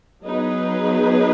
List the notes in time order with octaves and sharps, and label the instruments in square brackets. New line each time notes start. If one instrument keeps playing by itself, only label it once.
[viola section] F#3 B3 D#4 G#4 B4